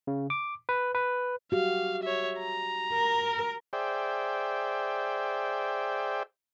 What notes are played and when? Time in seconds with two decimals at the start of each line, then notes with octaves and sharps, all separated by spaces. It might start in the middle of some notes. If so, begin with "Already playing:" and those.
0.07 C#3
0.30 D6
0.69 B4
0.95 B4
1.52 F#4 G4 F5
2.03 C#5 E5
2.39 A#5
2.93 A#4
3.73 G#4 C5 D5 E5 G5